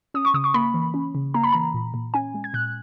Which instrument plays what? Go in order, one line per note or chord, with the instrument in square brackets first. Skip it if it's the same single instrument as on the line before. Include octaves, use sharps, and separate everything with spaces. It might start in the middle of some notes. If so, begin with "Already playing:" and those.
[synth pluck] C#4 D#6
C#6
C#3 D#6
C#6
A#3 B5
E3
C#4
C#3
A#3 A#5
B5
E3 A#5
A#2
A#2
C#4 G#5
G#3
G#6
A#2 F#6